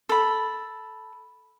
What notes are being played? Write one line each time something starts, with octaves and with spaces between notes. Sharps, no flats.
A4 B5